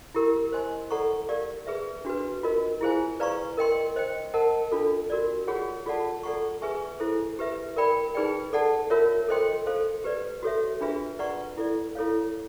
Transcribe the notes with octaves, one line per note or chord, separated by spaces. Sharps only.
E4 G4 A#4
C5 D#5 G#5 C6
A4 D5 F#5 A#5 C#6
G4 A#4 D5 F5
G#4 B4 E5
D4 F#4 B4
F4 A#4 D#5
E4 G#4 C5 F5 G#5
B4 D5 F5 A#5 C#6
A#4 D#5 G5 C6
C5 D#5 G5
A#4 D#5 F#5 A5
D4 F4 A4
F#4 A#4 D5
F4 G#4 C#5 F#5
F4 A4 D5 F#5 A5
A4 D5 F#5 A#5 C#6
G#4 B4 E5 G#5 C#6
E4 A4 C5
G4 B4 E5
A#4 D5 G5 B5
D#4 G#4 B4 D5 G5
A4 D5 F#5 A5
F4 A#4 C#5 E5
A4 C5 D#5 G5 C6
A4 C5 F5
G4 B4 D5
F#4 A4 C#5 E5
D4 F4 G#4 B4 E5
B4 D5 F#5 A#5 C#6
E4 A4 D5
E4 A4 C#5 F5